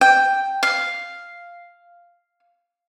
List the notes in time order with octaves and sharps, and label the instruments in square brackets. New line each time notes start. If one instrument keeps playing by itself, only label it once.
[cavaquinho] G5
F5